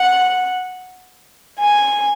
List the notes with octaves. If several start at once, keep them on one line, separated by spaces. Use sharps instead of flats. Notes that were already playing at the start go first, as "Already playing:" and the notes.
Already playing: F#5
G#5